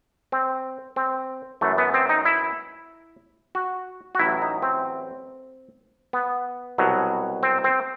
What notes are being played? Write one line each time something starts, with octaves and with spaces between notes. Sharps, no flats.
C4
C4
F#2 E3 A3
B3
C4
D#4
E4
F#4
F#4
A1 A2 F#3 E4
D#4
C4
B3
C2 B2 F#3
C4
C4